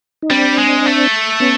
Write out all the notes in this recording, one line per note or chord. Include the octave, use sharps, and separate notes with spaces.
D#4
G3 C4 D4
G#3
A3
B3 C#4